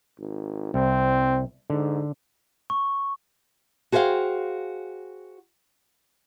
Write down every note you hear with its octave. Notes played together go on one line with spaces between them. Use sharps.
G#1
C2 C4
G#2 D3
C#6
F#4 G#4 C5 C#5 F5 G5